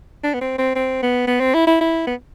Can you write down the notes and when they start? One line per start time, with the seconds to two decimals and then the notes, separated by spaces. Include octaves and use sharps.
0.24 D4
0.34 B3
0.41 C4
0.59 C4
0.76 C4
1.03 B3
1.28 B3
1.41 C4
1.54 E4
1.68 E4
1.81 E4
2.07 B3